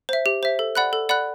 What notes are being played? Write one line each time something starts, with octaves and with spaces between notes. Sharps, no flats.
C5 E5
G4
C5 E5
A4
D5 F#5 B5 F#6
A4
D5 F#5 B5 F#6